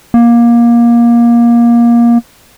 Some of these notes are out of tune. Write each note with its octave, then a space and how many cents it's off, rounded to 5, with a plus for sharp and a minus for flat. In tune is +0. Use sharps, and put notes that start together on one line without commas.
A#3 +20